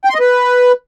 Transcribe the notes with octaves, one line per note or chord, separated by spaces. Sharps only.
G5
C6
D#5
B4